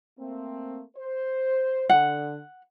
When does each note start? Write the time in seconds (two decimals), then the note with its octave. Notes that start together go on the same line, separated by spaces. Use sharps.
0.19 A3 A#3 C4
0.97 C5
1.89 D3 F#5